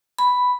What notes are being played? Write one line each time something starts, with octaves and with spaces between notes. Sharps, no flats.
B5